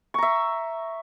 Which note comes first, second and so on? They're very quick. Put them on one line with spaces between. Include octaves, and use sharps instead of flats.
C#6 A#5 E5